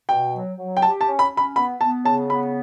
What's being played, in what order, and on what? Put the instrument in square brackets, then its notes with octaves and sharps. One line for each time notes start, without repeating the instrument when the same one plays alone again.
[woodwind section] B2 [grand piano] G5
[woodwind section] F#3
F#3
[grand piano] G5
[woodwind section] G4 [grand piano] A5
[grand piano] A5
[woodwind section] C#4
[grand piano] B5
[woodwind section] C#4
[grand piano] B5
[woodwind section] B3 [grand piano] B5
[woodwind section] B3 [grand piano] A5
[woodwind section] C#3 [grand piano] A5
[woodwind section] B3 [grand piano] B5